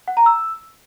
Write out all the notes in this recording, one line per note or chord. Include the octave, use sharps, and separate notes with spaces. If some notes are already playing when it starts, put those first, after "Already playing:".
F#5
A#5
E6